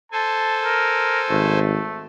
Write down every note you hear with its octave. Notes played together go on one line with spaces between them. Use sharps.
A4 C5 G#5 A5
A#4
G#1 A3